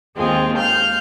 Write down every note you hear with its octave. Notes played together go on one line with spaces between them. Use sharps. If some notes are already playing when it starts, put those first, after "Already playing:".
D#2 G#3 C4 F4 G#4
F5 F6 G6